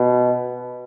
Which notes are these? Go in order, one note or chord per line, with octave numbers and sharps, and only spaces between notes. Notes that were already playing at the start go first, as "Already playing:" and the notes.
Already playing: B2